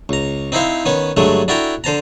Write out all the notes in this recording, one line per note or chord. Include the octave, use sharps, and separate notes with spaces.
C#2 A#5
C4 D#4 E4 C5 F5
D#3 B3 C#4 C#5
G2 D3 F#3 G#3 A3
D4 E4 F#4 A4 G5 A#5
D3 C5 A5 A#5